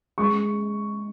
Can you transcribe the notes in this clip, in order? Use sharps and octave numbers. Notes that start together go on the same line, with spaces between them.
G#3 C#6